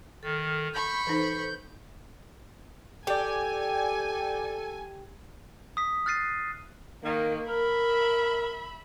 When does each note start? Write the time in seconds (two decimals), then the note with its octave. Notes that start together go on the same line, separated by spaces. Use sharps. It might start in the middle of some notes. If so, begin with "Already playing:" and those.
0.23 D#3 A4
0.73 B5 C#6 G6
1.07 E3 D#4 A4 B4 C5
3.07 G4 A4 D5 G5 G#5
5.77 D#6 B6
6.06 F6 F#6 A6 C7 D#7
7.03 D#3 A#3
7.48 A#4 E5 B5